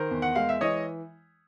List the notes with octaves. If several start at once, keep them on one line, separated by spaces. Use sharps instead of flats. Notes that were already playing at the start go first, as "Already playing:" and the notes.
Already playing: D#3 A#4 C5
E2
F#5
G#3 F5
E5
E3 C#5 D#5